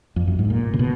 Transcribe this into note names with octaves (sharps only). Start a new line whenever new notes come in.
F2
F#2
G#2
A#2
C#3
B2